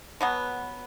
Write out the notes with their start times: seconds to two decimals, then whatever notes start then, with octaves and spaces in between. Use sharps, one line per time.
0.21 B2 F#3 B3